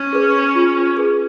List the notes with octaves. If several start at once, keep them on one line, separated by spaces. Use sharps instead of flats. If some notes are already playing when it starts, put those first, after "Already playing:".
Already playing: C#4
G#4 B4
F4
G#4 B4